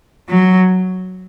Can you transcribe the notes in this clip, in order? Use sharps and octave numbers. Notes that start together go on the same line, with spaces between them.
F#3